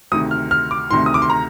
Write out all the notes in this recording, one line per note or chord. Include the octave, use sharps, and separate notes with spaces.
D2 C3 D#3 D#6
F6
F6
D6
D2 C3 D#3 C6
D#6
D6
C6
A#5